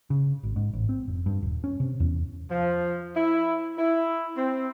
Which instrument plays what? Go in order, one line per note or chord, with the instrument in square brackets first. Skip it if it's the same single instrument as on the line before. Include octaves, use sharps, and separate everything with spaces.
[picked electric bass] C#3
G#1
G#2
A1
C4
F1
G2
D#1
C#4
C3
E2
[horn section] F3
E4
E4
C4